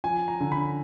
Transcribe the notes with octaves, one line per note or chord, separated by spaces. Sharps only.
F3 G#5
A#5
D3
B5